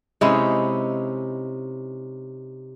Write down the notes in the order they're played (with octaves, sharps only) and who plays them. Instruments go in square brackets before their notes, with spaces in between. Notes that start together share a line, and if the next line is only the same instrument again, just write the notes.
[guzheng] C3 C#4 D#4 [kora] G#3 E4